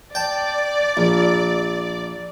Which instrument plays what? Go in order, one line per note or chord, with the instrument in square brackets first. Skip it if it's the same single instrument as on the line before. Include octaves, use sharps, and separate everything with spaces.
[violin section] D5 [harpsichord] G5 A5
[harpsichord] A#1